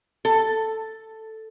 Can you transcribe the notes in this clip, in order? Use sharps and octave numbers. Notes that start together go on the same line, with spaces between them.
A4